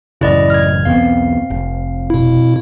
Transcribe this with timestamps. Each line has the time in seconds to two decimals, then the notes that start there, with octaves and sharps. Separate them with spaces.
0.21 A1 F#2 C#3 E4 D5 D#5
0.50 F6 G#6
0.85 B1 E2 B3 C4 F5
1.50 F1
2.10 B2 E4